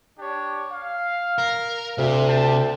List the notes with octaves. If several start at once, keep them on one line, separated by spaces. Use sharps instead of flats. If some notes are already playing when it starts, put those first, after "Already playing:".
D4 G4 C#5
F5
A#4
D2 C3
G5 A5